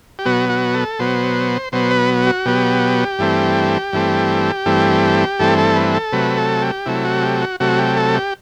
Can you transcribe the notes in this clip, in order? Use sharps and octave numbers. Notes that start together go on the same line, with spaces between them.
G4
B2 F#3 B3 F#4
F#4
A4
B2 F#3 B3 C5
B2 F#3 B3 C5
B4
F#4
B2 F#3 B3 G4
G2 E3 A3 C4
G2 E3 A3 C4
G2 E3 A3 C4
G2 E3 A3 C4 A4
A4
B4
A4
C3 F#3 A3 B4
A4
G4
C3 F#3 A3 E4
F#4
G4
F#4
C3 F#3 A3 F#4
G4
A4
G4